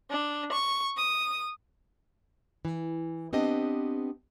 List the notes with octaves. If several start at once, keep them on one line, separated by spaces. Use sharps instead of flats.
D4
C#6
D#6
E3
B3 C4 D4 G4 D#5